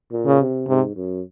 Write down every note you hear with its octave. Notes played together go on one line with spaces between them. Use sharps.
A#2
C#3
C3
G#2 C3
F#2